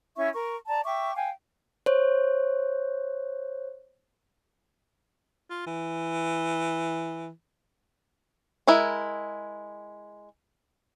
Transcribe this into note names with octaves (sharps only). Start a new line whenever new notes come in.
C#4 E4 E5 C#6
A#4 C#6
D5 A5 A#5
E5 G5 C#6 D6
F5 G5 G#5
C5 C#5
F4
E3
G#3 E4 A#4 B5